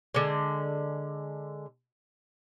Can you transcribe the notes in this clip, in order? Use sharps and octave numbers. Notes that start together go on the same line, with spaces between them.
D3 G#3